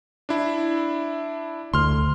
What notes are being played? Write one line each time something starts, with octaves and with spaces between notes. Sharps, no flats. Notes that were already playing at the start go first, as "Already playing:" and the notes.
D4 E4
D2 C6 F6